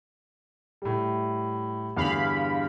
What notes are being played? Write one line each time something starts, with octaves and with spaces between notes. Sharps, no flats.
A2 G3
E2 G2 D3 F5 B5